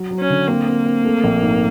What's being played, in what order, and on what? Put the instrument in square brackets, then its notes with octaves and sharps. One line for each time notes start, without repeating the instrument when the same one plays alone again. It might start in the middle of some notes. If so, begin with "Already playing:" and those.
Already playing: [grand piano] F#3
F#3
[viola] C#4
[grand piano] D3
[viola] A#3 [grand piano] C4
[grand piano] C4
C4
A3
A#1
G#2